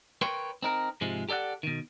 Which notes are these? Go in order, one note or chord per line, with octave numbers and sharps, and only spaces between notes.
A#4 B4 C#5 G5 C6
C4 D#4 A#4
G#2 C3 F3 G#3
G4 A4 D5 E5 F#5
B2 D#3